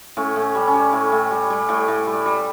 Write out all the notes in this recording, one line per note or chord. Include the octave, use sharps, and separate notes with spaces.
A2 C#4
A2
C#4
G3
C#4
G3
A2
A2
G3
G3
A2
A2
G3
G3